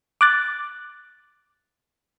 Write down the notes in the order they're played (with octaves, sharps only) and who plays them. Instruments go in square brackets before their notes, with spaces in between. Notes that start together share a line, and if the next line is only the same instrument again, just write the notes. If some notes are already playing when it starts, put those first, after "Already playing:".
[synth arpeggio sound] D6 F#6 A6